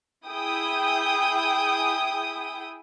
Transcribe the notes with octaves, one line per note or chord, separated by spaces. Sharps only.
E4 G#4 G5 D#6